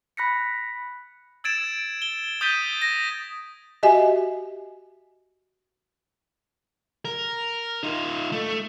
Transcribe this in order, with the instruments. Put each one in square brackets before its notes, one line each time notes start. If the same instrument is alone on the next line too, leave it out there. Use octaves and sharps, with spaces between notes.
[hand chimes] B5 F#6 A#6 B6 C#7
[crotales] E6 G#6 A6 D7 E7
G7
D#6 G6 A6 B6 D#7 G7
A#6
[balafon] F#4 G4 D#5 E5 G#5
[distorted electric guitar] A#4
D#4 F4
A3